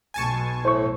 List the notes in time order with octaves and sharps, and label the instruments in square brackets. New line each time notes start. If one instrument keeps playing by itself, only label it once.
[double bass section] B1 B2 [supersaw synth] G#5 A5 C#6
[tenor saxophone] A2 [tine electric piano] C5 C#6